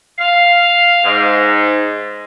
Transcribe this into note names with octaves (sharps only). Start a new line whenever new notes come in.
F5
G#2